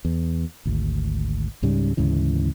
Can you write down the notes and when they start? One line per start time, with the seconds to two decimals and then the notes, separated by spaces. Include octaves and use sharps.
0.05 E2
0.66 G#1 D2
1.62 C#2 G#2 C#3 G3
1.97 D2 G#2 C#3 E3